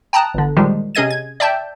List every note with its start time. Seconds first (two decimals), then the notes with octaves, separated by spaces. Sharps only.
0.13 G5 A5 A#5 D#6 F#6
0.34 G1 D3
0.57 A#2 D#3 F3 G3 G#3
0.95 C3 C#4 G#4 D#5 G#6 D#7
1.11 G#6
1.40 D5 E5 G5 A5 G6